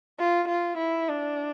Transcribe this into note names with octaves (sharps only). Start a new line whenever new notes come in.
F4
F4
E4
D4